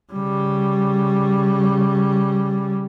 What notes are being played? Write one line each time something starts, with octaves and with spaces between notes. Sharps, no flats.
C#3 G3